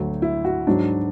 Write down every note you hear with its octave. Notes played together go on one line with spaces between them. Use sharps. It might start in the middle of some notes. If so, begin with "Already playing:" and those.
Already playing: D2 D3 F#3
E4
F#4
G#2 F#3 D4